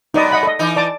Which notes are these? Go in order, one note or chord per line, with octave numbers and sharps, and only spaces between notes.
F#2 B3 D#4 D5 D#5
D#5 F#5 B5
A4 D#5
E3 D#4
D5 A5 D6